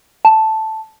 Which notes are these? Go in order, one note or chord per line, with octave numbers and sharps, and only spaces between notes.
A5